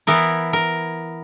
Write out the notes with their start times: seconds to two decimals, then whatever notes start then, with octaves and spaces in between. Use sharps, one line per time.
0.07 E3 B3 E4 A#4
0.53 A#4